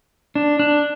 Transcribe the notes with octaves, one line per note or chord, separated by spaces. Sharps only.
D4
D4